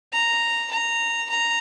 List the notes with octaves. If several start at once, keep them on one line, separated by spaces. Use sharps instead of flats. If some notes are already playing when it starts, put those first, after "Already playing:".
A#5
A#5
A#5